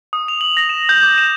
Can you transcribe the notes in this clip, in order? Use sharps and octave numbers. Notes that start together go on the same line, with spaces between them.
D#6
F7
F#7
A#6
E7
G6
D6
E7